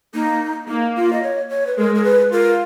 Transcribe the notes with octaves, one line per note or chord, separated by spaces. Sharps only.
A#3 D#4
A#3 D#4
F4
D#5
C#5
C#5
B4
G#3 A#4
A#4
B4
F4 A#4